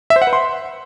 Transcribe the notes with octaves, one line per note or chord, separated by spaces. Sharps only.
E5
C5
F#5
B4
C6